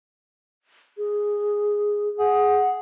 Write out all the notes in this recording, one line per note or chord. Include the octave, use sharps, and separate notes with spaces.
G#4
G#4 F#5